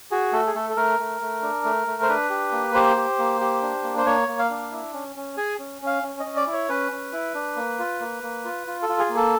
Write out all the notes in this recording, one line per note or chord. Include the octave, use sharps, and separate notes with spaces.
F#4 G#4
A3 A4
G#4
A3 A4
A4
A3 A#4
A3
A3
D4
A3
A3
C5
D4 B4
G4
A#3
G4 C5
G4
A#3
G4
D4
A#3
C5
A#3 C#5
A#3
F5
D4
E4
C#4
C#4
G#4 G#5
C#4
C#4 F5
C#4
D#5
C#4
D5
E4
C#5
C#4 B4
C#4
E4
D4
A#3
F4
A#3
A#3
F4
F4
A4
F4
G#4
A#3
A4